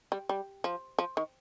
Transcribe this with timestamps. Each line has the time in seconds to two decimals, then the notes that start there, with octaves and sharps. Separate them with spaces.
0.12 G3
0.29 G3
0.64 F3
0.99 F3
1.17 D#3